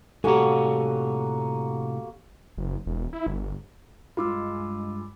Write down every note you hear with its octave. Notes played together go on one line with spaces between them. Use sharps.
A2 C3 A#3 F#4 G4 A4 C#5 G#5
F#1
E1
E4
G1
G2 G#3 F4 B5 D6 E6